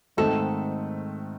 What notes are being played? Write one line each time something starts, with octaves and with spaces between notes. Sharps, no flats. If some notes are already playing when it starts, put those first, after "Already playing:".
G#2 D#3 A3 C4 A4